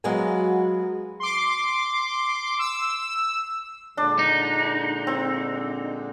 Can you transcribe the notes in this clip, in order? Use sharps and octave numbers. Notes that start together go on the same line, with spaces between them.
F#3 G#3 B3 F#4 F5 G#5
C6 D6
E6
A#2 D3 G#3 D4
D#4
C4